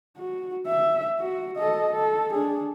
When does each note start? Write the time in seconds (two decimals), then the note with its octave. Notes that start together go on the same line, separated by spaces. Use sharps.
0.17 F#4
0.66 E5
1.19 F#4
1.57 A4 D#5
1.92 A4
2.33 D4 G#4